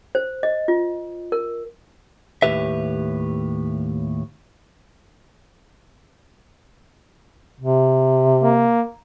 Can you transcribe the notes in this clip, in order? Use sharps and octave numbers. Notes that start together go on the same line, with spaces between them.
C5
D#5
F4
A#4
D#2 A2 C3 G4 B4 E5
C3
A#3